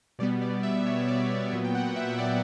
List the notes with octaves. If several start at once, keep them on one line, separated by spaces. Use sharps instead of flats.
B2 G3 B3 D5
D5
E5
C#5
E5
D5
E5
A#2 F#3 B3 E5
G5
F#5
E5
E5
D5